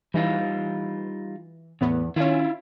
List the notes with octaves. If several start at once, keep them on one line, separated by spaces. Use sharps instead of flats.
E3 G3 D#4 F4
E2 A2 B3
D#3 C#4 E4 F4